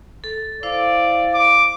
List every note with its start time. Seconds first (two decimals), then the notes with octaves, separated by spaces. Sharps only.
0.24 A4
0.63 E4 C5 D5 F5
1.35 D6